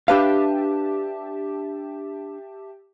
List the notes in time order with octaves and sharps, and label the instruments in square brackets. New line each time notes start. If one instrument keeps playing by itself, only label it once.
[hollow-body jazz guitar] D4 B4 F5 [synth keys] G4 E5 A5